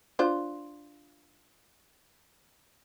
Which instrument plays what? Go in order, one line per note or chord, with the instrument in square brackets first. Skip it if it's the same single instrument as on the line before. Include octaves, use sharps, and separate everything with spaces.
[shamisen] D4 F4 C5